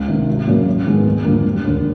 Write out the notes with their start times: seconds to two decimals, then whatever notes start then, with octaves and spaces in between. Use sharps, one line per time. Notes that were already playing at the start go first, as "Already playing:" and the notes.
Already playing: C#2
0.08 C3 D#3
0.27 G#1
0.47 F#2 C#3 F#3 A#3
0.66 G#1
0.86 G#2 D#3 G#3 B3
1.05 F1
1.24 F2 D3 G3 A#3
1.45 E1
1.64 D#2 D3